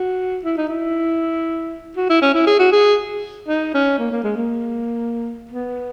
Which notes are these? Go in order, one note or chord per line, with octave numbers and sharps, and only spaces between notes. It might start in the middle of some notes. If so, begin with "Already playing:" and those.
Already playing: F#4
E4
D#4
E4
F#4
E4
C#4
E4
G#4
F#4
G#4
D#4
C#4
A#3
A#3
G#3
A#3
B3